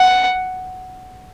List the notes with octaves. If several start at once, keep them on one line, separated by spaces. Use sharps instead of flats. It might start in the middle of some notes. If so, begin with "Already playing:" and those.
Already playing: F#5